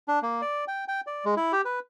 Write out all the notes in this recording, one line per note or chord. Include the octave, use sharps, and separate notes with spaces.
D4
A#3
D5
G5
G5
D5
G#3
E4
G4
B4